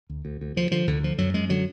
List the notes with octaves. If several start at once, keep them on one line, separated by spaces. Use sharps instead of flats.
D2
D2
D2
D2 F3
D3 F3
D2 D3
D3 F3
F#2 F#3
F#2 G#3
D3 F#3